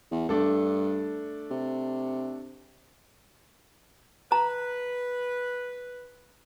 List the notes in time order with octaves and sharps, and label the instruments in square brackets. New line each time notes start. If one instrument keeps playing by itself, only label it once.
[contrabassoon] E2
[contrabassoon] G2 [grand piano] A3 D4 A4
[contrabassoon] C3
[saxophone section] B4 [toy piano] A#5